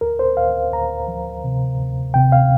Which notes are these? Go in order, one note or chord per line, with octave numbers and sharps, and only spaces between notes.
D2 A#4
C5
D2 F5
D2 A#5
F3
C3
D2
C3 G5
F5